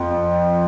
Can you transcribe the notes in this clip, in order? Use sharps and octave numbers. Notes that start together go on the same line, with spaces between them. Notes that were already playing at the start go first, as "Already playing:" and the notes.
Already playing: F2